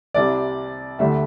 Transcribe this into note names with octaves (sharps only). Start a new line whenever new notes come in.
C2 C3 G3 D5
D2 D3 G3 E5